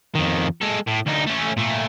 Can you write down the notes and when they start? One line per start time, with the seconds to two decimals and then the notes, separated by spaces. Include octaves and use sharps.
0.15 F2 D#3
0.62 G#3 A4
0.88 A2
1.07 D2 D#4
1.27 A3 C#4
1.57 A#2 A3